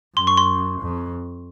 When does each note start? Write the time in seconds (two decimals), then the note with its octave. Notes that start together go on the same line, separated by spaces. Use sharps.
0.17 F#2 C6
0.27 C#6
0.37 C6
0.81 F2